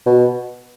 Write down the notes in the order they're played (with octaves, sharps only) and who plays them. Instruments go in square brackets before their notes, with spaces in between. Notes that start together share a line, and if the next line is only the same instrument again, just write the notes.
[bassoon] B2